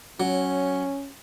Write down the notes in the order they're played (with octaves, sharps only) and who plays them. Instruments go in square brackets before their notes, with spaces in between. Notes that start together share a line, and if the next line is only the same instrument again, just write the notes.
[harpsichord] F#3 [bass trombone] C#4